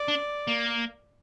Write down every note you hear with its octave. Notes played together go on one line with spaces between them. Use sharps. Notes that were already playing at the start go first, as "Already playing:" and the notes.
Already playing: D5
D4
A#3